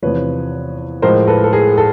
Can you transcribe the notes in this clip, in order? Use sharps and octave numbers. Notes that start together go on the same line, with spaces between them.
E2 C3 F3 B4 C#5
A2 F3 G#3 A#4 C5
A4 B4
A4
G#4 A#4
A4